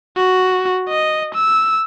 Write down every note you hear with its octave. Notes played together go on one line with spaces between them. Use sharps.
F#4
D#5
E6